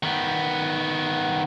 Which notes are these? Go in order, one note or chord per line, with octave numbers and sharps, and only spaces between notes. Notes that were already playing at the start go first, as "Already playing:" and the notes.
D#3 B3